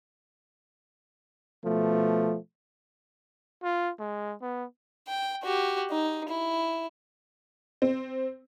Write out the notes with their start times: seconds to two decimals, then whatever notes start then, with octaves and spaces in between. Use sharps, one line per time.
1.65 B2 F3 A3
3.63 F4
3.99 G#3
4.42 B3
5.08 G5
5.44 F#4 G4
5.91 D#4
6.28 E4
7.82 C4